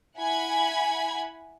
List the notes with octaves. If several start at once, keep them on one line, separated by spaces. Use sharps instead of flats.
E4 F#5 G#5 B5 G#6